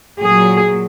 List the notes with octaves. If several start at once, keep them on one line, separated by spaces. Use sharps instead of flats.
A#2 F#3 G#4